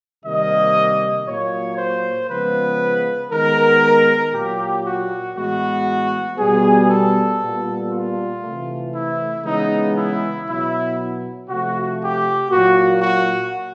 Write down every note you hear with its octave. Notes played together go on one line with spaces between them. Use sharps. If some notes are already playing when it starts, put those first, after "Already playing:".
C3 D#3 G3 A#3 D#5
A#2 F#3 A#3 C#5
C5
C#3 F3 G#3 B3 B4
D#3 G#3 B3 A#4
A#2 F#3 A#3 G4
F#4
A2 E3 G#3 B3 F#4
B2 G3 B3 G#4
A4
A#2 G3 B3
F4
C3 E3 A3
E4
C#3 E3 G#3 B3 D#4
E4
B2 F#3 B3 E4
C3 F3 A3 F#4
G4
A#2 F#3 A#3 F#4
F#4